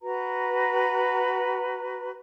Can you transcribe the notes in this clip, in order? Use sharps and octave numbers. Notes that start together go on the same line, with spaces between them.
F#4 B4 A#5